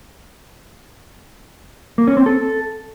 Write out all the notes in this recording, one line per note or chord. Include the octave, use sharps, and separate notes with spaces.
A#3
C#4
C4
A4